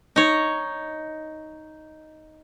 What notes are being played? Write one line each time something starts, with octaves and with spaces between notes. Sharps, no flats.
D#4 C#5